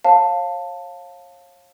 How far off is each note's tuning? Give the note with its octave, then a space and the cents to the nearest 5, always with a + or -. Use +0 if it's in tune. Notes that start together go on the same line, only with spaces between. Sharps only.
C#5 -35 F5 +10 A5 +10